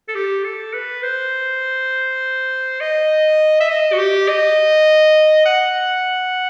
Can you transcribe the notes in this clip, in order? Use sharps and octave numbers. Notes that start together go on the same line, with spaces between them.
A4
G4
A4
B4
C5
D#5
E5
D#5
F#4
G4
D#5
F#5